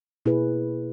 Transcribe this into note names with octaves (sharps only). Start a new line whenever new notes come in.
B2 A#3 E4 G#4 B4